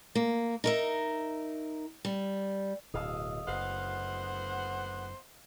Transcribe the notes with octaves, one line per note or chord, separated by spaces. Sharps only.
A#3
D#4 A#4 E5
G3
D1 B2 D#5 F5 E6
F#1 D2 B3 C5 F5 F#5